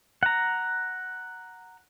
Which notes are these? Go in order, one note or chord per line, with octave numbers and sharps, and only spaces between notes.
F#5 A#5